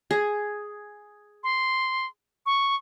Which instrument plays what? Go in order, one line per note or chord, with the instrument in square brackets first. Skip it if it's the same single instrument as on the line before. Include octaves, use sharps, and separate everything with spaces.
[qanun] G#4
[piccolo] C6
C#6